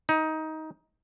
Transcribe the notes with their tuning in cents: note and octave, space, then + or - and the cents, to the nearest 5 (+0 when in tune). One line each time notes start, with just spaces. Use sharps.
D#4 +15